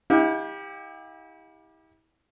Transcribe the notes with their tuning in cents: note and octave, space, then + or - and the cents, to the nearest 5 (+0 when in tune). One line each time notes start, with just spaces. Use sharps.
E4 -35 G4 +20 F5 +45